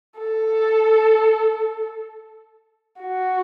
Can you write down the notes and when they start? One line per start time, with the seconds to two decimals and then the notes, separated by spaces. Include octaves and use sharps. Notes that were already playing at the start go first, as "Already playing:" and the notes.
0.19 A4
3.01 F#4